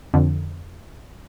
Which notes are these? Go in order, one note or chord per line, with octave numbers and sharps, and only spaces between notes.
F2 D3